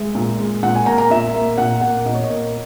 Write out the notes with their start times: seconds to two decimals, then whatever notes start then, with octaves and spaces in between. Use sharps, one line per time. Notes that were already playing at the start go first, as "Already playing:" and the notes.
Already playing: G#3 E5
0.15 A#2
0.40 G#3
0.63 A#2 F#5
0.76 G#5
0.86 A#3 A#5
0.98 A#5
1.10 A#2 E5
1.34 A#3
1.58 A#2 F#5
1.81 A#3 F#5
2.06 A#2 D#5
2.15 C#5
2.23 D#5
2.30 A#3